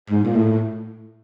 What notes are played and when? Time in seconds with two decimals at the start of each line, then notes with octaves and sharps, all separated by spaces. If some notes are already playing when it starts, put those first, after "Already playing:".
0.10 G#2
0.24 A#2
0.35 A2